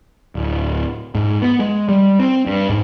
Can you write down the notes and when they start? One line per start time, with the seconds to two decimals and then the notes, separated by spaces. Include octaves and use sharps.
0.35 D1
1.15 G#2
1.42 B3
1.59 G#3
1.89 G3
2.19 C4
2.46 G2
2.69 G#2